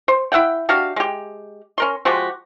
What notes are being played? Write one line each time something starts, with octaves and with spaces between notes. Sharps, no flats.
C5
E4 E5 F#5 G5
D4 F#4 G4 F5
G#3 G4
C#4 A#4 C6
F3 G#3 F#4 G4